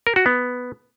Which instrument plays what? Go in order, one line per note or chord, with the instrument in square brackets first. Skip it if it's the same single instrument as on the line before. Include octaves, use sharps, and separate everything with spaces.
[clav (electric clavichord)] A#4
F#4
B3